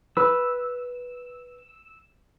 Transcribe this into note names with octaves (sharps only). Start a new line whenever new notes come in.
B4 E6